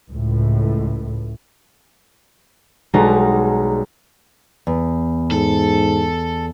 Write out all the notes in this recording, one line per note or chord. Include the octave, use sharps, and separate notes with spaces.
C#2 A2
B1 B2 G3 G#3 D#4 A#5
E2
G#2 A4